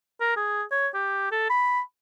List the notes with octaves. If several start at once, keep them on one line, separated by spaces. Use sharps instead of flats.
A#4
G#4
C#5
G4
A4
B5